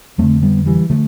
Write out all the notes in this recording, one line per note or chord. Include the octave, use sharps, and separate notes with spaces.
F2 D3 A3 C4
G3 B3
E3 G3
D3 F3 A3